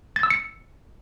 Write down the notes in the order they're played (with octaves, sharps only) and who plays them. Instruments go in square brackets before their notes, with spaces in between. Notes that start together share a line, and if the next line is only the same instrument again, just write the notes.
[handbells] A6
E6
C#7